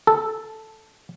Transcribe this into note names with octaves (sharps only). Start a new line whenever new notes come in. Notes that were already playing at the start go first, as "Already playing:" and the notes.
A4